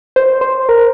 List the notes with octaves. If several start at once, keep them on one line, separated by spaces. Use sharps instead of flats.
C5
C5
A#4